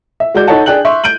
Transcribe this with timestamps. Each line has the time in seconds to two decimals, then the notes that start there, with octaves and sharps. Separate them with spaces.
0.20 E5
0.34 G#3 F#4 D5 G6
0.47 D#4 A4 C#5 D#5 F#5 A5
0.66 D4 G#4 G5 F#6 F#7
0.85 E5 C6 C#6
1.04 G6 D7 D#7 F#7